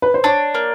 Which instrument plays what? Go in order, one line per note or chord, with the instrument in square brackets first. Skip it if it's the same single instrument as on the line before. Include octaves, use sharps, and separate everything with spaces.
[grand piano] B4
C5
[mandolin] D4 [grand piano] C#5
[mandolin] A#3